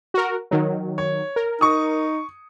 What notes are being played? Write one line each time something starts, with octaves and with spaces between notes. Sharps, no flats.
F#4 A#4
D#3 F#3
C#5
A#4
D#4 C#6 D#6